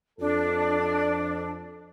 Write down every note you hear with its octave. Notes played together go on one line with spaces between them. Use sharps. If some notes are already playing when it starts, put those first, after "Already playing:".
F2 D4 A4